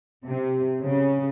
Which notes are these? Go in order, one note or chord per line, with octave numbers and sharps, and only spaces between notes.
C3
C#3